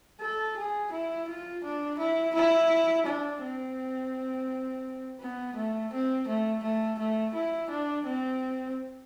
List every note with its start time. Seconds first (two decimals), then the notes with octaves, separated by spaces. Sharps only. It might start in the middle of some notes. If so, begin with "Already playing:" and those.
0.20 A4
0.57 G#4
0.92 E4
1.28 F4
1.64 D4
1.99 E4
2.35 E4
3.06 D4
3.43 C4
5.21 B3
5.56 A3
5.93 C4
6.28 A3
6.63 A3
6.99 A3
7.35 E4
7.70 D4
8.06 C4